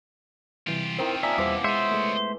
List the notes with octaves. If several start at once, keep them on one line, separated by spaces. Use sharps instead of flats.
C3 E3 G3 F4 G4
D#3 C4 E4 A#4 C5
F3 A#3 C#4 D5 E5 G#5 A#5
E2 B2 E3 G3 C5 D6
G#3 C5 C#5 D#5 E5
G#3 A3